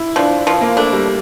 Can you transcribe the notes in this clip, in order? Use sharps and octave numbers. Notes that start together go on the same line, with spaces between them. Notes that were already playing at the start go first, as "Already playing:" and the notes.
Already playing: E4
F3 D4
F3
A#3
A3 D4
G3